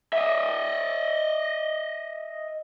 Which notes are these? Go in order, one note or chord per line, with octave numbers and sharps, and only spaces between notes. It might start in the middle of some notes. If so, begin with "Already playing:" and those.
D#5 E5